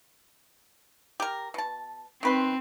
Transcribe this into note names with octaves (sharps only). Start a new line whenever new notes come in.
G4 A#4
B2 A5
D#3 C4 B4 C6